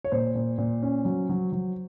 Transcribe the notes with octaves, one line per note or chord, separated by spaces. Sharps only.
C#5
A#2 C5
A#2
A#2
C#4
F#3
F#3
F#3